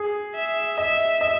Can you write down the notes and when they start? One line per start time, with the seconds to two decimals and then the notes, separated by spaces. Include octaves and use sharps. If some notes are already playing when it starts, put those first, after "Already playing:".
Already playing: G#4
0.35 E5
0.78 D#5 E5
1.21 D#5